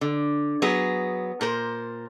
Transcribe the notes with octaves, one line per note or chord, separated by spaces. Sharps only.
D3
F#3 B3 G#4
A#2 A#4 C5